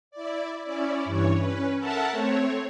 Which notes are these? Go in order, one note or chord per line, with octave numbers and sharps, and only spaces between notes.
E4 D5
C#4 E4 D5
G2 E3 C#5
C#4 B4
A4 A#4 E5 F#5 A5
A3 C4 C#5